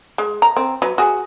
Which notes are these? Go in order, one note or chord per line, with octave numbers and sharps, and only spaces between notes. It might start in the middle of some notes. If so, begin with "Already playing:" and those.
G#3
A#5
C4
F#3 B4
F#4 G#4